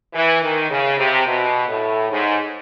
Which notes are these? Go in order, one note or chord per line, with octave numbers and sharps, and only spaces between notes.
E3
D#3
C#3
C3
B2
A2
G#2